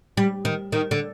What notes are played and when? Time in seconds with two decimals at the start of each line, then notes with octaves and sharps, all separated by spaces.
0.17 G3
0.45 D#3
0.72 D#3
0.91 D3